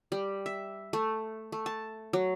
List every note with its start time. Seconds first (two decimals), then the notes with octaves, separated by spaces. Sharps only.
0.12 G3
0.46 E5
0.93 A3
1.52 A3
1.66 A5
2.13 F#3